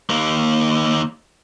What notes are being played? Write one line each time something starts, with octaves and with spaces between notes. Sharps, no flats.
D#2 A#3